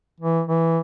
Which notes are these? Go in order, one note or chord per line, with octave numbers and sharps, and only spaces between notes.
E3
E3